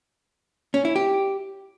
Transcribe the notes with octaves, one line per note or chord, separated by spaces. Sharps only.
C#4
E4
G4